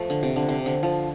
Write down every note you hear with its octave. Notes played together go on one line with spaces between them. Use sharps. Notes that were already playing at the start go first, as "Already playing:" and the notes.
Already playing: F3 A3
D3
C3
D3
C3
D3
F3